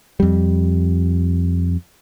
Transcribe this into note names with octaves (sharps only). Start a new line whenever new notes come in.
F2 G3